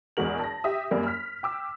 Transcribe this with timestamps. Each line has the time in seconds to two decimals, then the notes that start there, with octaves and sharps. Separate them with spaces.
0.17 A#1 E2 G#3 F#4 A#4 F#7
0.40 A5 A#6
0.64 G4 E5 D#6
0.91 F#2 G3 A#3
1.06 F6 B6
1.43 G5 D6 E6